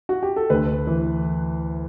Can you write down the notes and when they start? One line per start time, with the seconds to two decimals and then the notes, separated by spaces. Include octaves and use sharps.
0.09 F#4
0.23 G4
0.36 A4
0.50 D2 B4
0.87 E3